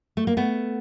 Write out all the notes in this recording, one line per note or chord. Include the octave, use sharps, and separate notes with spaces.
A3
A#3
A3 B3